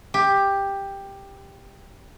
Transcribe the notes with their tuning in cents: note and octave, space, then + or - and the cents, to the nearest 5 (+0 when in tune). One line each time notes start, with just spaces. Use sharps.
G4 +10